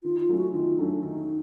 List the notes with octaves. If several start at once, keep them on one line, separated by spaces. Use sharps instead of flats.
D#3 F4
F4
F#3 A3 C#4
F#4
D#3 F4
F#3 A3 C#4 D4
D#3 D#4